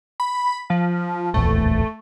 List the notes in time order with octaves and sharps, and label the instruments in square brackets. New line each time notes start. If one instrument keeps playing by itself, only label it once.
[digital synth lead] B5
F3
[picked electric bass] D1 A#1 E2 [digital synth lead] A3